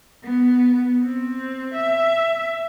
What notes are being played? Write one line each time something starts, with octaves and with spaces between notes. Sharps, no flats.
B3
C4
E5